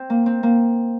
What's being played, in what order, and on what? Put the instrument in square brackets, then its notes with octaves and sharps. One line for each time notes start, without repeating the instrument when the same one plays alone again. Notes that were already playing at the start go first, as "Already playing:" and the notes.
Already playing: [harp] C4
A#3
C4
A#3